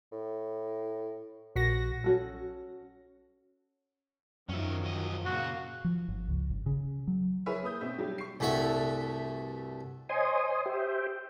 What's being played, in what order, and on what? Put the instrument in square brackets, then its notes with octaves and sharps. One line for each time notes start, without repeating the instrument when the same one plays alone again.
[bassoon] A2
[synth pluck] A#1 A#6 [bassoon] F#4
[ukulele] C#4 F#4 A4
[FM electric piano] F#2 [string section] D#3 F3 F#3 [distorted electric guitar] C#4 E5
[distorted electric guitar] E2 D#5
[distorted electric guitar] A#2 C#3 [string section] A#3 F5 [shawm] F#4
[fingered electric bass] F3
G1
C#2
G1
C#3
F#3
[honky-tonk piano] E4 G#4 A#4 B4 C#5 E5
A#3 B4 D#6 G6
B2 C4 E5 G6
F#3 G3 G4
C#6 C7
[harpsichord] C2 G2 A3 F#4 E5
[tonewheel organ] C5 C#5 D#5 G#5 C6 D#6
G4 C5 E5 G5